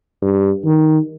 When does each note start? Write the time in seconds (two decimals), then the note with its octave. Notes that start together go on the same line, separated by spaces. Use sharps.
0.22 G2
0.65 D#3